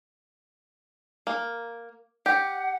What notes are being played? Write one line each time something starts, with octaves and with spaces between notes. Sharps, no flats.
A#3
G4 F#5